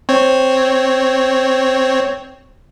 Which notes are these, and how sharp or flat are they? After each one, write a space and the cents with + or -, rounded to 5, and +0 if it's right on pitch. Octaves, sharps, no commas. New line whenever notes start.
C4 +0 C#5 -5